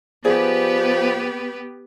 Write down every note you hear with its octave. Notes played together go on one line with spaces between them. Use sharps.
F3 B3 G4 G#4 B4 D5